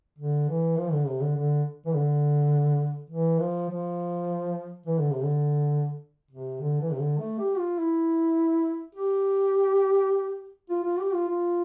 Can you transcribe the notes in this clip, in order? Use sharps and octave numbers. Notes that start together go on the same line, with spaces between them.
D3
E3
F3
D3
C3
D3
D3
E3
D3
E3
F3
F3
E3
D3
C3
D3
C3
D3
E3
C3
D3
A3
G4
F4
E4
G4
F4
F4
G4
F4
F4